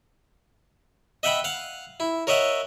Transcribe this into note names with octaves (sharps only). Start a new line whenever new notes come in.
D#5 E5 F#5 G5 B5
F5 F#5
E4
A#4 C#5 D#5 E5 F#5